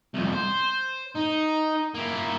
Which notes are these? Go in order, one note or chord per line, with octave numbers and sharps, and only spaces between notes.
C2 F2
C5
D#4
A#3 E4